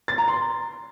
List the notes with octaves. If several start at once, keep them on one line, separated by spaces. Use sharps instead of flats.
A6
A#5
C6